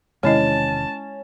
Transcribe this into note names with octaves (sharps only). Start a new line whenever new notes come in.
E1 C3 D#3 G#3 C#4 E4 D#5 A5